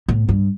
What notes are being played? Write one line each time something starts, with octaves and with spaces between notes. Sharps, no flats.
A2
G2